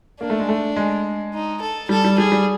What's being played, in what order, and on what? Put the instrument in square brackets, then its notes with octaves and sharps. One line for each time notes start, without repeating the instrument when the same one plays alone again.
[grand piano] A#3 [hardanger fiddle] D4
[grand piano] A3
G#3
A3
G#3
[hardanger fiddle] D#4
A4
[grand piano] G3 [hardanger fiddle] A4
[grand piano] G3
[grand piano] G3 [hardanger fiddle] G#4
[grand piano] G3